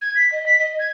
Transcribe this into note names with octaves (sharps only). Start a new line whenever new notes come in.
G#6
B6
D#5
B6
D#5
G#6